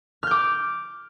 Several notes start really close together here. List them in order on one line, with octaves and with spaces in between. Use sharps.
F6 G6 D6